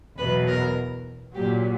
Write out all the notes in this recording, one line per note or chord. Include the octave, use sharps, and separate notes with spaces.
E2 B2 F#3 B4
A#4
A#2 F#3 G4